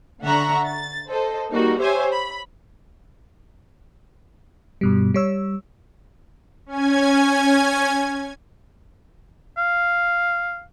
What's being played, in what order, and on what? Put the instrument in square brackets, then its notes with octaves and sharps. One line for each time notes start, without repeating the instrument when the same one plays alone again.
[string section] D3 E5 F#5 A#5 C#6 F#6
A6
A4 C5 D#5
G3 A#3 D#4 F#4
G4 C5 C#5 E5 G#5
B5
[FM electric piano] G2 B2 G3
G3 C#5 E6
[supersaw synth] C#4 G#5 G#6
[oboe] F5